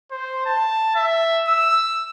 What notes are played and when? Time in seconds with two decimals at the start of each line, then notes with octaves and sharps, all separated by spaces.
0.11 C5
0.46 A5
0.95 E5
1.48 E6